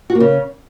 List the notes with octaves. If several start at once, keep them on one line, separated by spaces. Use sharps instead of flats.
F#4
A#3
C#3